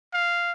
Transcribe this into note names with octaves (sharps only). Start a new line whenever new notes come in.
F5